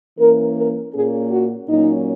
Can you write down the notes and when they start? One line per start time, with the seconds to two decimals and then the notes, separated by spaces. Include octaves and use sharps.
0.19 E3 A#3 C#4 A#4
0.56 A#4
0.93 A#2 A#3 C#4 G#4
1.31 F#4
1.69 A#2 F#3 A#3 C#4 D#4